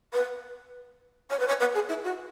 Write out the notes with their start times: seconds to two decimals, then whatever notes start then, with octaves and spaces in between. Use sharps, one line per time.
0.12 B4
1.30 C#5
1.39 B4
1.47 C#5
1.60 B4
1.74 G#4
1.89 E4
2.04 F#4